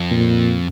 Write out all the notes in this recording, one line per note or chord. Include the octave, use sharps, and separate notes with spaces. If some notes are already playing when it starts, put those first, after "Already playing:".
Already playing: F2
A#2